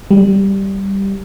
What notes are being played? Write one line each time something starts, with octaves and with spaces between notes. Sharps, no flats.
G3